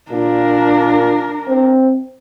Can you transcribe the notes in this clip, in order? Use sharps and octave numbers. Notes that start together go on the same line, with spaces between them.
A#2 D4 A#4
C4